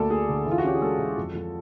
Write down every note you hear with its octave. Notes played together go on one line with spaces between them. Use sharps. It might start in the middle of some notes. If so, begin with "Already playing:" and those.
Already playing: D2 A#3 A4 D5
D2 G#4
D3
E3
F4
F#4
C#4 G4
G#4
G#3 A4
E3
F2
F3